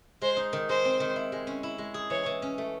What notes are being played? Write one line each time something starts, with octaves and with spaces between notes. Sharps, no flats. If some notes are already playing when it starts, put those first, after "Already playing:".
G#3 C5
D#4
D#3
G#3 C5
C4
D#3
E4
G#3
C#4
E4
G#3
G#4
E3 C#5
E3
C#4
A3